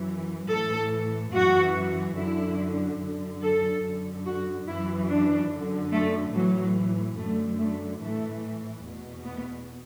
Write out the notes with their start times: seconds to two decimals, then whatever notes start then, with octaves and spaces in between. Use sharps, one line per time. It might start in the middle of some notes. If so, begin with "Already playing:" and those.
Already playing: F#2 E3
0.50 A2 E3 A4
1.33 F#2 E3 F#4
2.17 F#2 D3 E4
3.01 F#2 D3
3.42 A4
3.84 F#2 D3
4.25 F#4
4.67 F#2 E3 E4
5.09 D4
5.51 F#2 D3
5.92 A3
6.34 A2 E3 F#3
7.17 F#2 D3 A3
7.58 A3
8.01 A2 E3 A3
8.84 E2 B2
9.25 B3